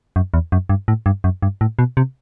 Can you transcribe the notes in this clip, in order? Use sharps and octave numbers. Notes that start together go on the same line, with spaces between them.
F#2
E2
F#2
G2
A2
G2
F#2
G2
A2
B2
C3